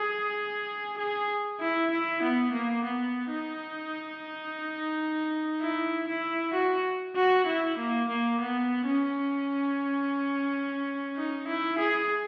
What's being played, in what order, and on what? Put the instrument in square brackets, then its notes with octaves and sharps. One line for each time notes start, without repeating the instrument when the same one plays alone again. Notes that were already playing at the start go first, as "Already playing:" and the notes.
Already playing: [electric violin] G#4
G#4
E4
E4
B3
A#3
B3
D#4
E4
E4
F#4
F#4
E4
A#3
A#3
B3
C#4
D#4
E4
G#4